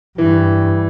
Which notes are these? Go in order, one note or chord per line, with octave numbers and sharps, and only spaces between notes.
G2 E3